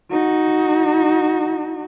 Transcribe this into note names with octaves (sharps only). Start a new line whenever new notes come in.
D#4 F#4